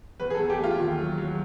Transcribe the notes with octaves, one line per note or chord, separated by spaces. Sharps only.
E2 B4
G#4
A4
E2
G4
A3 F4
D#2
F#3
F#3